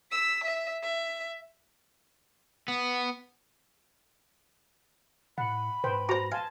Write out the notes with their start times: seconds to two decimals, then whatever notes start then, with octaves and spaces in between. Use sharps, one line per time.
0.11 E6 B6
0.44 E5
0.82 E5
2.68 B3
5.38 A2 F#5 B5
5.84 G#2 B4 C5 G5
6.09 F#4 C5 A#5
6.32 F5 G#5 A5 C6